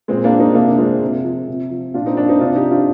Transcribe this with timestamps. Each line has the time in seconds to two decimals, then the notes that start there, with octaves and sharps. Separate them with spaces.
0.08 A#2 G#3 C4
0.24 A#3 D4
0.32 F3
0.40 C4 D#4
0.55 C3 A#3 D4
0.78 F3 G#3 C4
1.02 C3
1.24 F3
1.47 C3
1.71 F3
1.94 A#2 D4 F4
2.06 C4 D#4
2.17 F3 A#3 D4
2.28 C4 D#4
2.40 C3 D4 F4
2.55 D#4 G4
2.64 F3
2.71 D4 F4